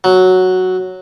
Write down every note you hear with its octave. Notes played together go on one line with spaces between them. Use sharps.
F#3